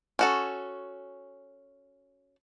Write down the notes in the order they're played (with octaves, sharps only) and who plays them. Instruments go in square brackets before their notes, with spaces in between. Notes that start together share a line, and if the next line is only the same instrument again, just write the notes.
[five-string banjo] C#4 F#4 A4